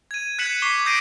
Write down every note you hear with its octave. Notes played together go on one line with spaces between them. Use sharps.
G#6 D#7
F#6 G#6 B6 C#7 E7 F#7
C#6 D6 B6 C7 G7
D#6 G6 A#6 C7 D7 D#7